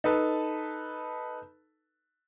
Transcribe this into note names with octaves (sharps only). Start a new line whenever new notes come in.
D#4 A4 B4 A5